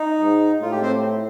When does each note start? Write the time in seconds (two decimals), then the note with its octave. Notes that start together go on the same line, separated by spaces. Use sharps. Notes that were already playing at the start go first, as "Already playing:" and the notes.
Already playing: D#4
0.21 G#2
0.61 A2 F4
0.71 G4
0.82 C4 C5